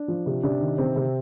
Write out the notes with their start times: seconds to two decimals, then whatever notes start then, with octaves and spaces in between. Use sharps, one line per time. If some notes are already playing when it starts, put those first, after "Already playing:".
Already playing: D4
0.08 F3
0.26 C3
0.43 C3 D4
0.61 D#3
0.78 C3 C4
0.96 C3